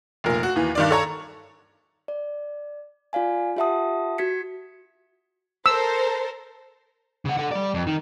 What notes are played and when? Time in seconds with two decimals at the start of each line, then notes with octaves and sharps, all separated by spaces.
0.24 F1 A#2 A#4
0.43 F#4
0.56 D#2 E3
0.75 G2 D#3 D5
0.91 A4 C#5 A#5
2.08 D5
3.13 F4 D5 F5 G#5
3.57 F4 G4 E5 F#5 A5 D#6
4.18 F#4 G#6 B6 C#7
5.66 A4 A#4 C5 E6
7.25 C#3 F#5
7.37 A4 F#5
7.51 G3 D5
7.74 F2
7.87 D#3